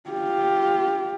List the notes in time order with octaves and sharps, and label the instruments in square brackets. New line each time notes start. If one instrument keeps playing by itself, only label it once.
[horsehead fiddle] F4 G4